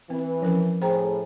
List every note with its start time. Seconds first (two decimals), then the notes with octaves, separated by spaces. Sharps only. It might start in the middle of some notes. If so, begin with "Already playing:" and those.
0.10 E3 C4 B4
0.42 F3 C#4 A#4
0.82 A2 G#4 C5 G5 A#5